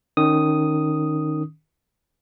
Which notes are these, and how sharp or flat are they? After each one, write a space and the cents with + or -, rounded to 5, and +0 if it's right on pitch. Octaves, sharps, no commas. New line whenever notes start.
D#3 -15 C#4 +0 D#6 +0